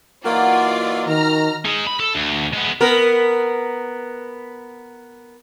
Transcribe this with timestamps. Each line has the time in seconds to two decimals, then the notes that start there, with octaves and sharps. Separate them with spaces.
0.24 E3 F#3 A#3 D#4 F4 F#4 D5
1.08 D#3 A#4 A#5 F6
1.65 D#4 G#4
1.87 B5
2.00 A4
2.15 D2
2.54 G#3 B3
2.81 B3 A#4